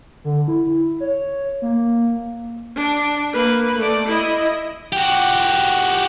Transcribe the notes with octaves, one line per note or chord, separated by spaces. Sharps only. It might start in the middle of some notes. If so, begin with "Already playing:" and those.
D3
E4
C#5
A#3
D4
A#3 B4
A3 D5
E4 D#5
F#4 G4